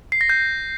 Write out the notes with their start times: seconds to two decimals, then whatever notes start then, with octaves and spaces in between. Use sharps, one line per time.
0.12 C7
0.21 A#6
0.30 G6